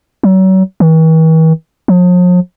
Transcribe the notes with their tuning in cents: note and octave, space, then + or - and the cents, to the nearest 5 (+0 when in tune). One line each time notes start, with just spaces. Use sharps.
F#3 +35
E3 -45
F3 +45